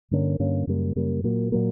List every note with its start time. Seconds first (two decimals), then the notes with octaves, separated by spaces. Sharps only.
0.11 G2 D3 A#3 C#4
0.39 G2 D3 A#3 C#4
0.67 F#2 C#3 G3 A#3
0.96 F#2 C#3 G3 A#3
1.24 A#2 F#3 A#3
1.52 A#2 F#3 A#3